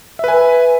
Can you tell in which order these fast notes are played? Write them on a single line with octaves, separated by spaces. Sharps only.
E5 B4 G#5